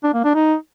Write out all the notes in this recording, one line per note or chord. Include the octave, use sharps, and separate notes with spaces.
D4
A#3
D4
D#4